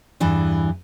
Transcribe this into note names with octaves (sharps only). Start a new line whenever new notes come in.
E2 G2 E3 D4